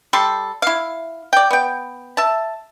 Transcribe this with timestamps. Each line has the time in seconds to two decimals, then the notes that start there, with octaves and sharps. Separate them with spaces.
0.13 G3 A4 C6
0.62 E4 F5
1.33 D5 G5
1.51 B3 G5
2.17 E5 A5